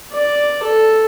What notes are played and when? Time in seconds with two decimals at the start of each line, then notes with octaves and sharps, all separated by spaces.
0.12 D5
0.63 A4